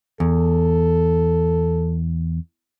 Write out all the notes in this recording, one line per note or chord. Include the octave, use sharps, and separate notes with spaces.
E2 A4